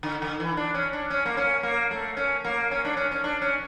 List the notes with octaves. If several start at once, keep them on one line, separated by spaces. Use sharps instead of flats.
D3
D3
E3
D4
C#4
D4
C#4
A#3
C#4
A#3
A3
C#4
A#3
C#4
D4
C#4
C#4
D4
C#4